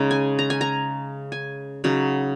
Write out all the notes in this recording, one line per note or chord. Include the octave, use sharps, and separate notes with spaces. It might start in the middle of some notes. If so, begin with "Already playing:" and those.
Already playing: C#3 G#3 D#4 A#5
G#5
A#5
G#5
A#5
G#5
C#3 F#3 D#4